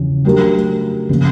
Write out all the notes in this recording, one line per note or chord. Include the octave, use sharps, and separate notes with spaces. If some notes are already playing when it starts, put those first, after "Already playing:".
Already playing: E2 C#3 F3
F#3 A3 D4 G4 A#4
C#3 F3 A#3